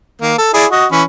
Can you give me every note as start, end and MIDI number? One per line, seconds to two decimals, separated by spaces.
0.21 0.33 51
0.21 0.33 58
0.38 0.51 69
0.54 0.66 64
0.54 0.66 68
0.54 0.66 74
0.71 0.86 66
0.71 0.86 75
0.92 1.03 52
0.92 1.03 61
0.92 1.03 83